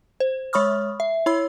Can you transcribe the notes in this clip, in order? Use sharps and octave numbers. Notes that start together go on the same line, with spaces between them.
C5
G#3 C#5 B5 C#6 D#6 F6
E5
E4 C#5 B5 E6